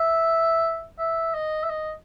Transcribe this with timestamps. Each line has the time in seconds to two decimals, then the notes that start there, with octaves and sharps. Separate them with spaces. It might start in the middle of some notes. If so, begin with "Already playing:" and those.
Already playing: E5
0.98 E5
1.34 D#5
1.63 E5
1.70 D#5